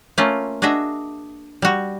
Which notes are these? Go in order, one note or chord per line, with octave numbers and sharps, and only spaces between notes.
A3 A#3 C#4 F4
D4 F#4 G#4 D#5 E5
G3 F#4